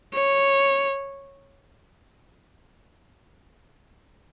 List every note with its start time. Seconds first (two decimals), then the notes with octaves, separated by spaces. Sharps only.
0.13 C#5